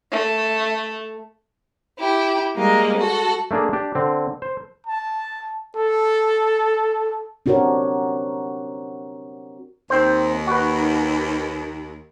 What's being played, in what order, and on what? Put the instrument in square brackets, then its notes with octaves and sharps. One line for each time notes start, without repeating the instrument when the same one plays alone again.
[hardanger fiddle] A3
[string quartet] E4 G4
G3 G#3 A#3 D#5
F#4 A4
[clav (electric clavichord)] A3 A#3 D4 G#4
D4 G4
D3 C4
C5
[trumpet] A5
A4
[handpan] C4 D4 F#4 G4 A#4 C#5
[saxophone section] D#2 [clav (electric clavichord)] C4 C5
[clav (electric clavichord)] F#4 B4